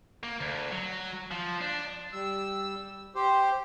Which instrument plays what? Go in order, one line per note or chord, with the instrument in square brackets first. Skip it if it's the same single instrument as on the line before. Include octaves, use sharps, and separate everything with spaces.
[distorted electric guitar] A#3
D2
F#3
F3
D4
[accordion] G3 E6
G4 C5